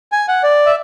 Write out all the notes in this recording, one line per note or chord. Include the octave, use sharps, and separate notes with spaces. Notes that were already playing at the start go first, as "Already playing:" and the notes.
G#5
F#5
D5
E5